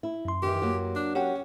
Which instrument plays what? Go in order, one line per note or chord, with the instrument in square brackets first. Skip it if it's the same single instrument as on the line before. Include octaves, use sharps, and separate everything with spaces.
[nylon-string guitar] E4
[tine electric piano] F#2 C6
[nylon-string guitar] D#3 E3 [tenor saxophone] G4
[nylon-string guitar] F#3 A#3
[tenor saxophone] D4
[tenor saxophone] C#4 [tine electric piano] G4 F#5 G5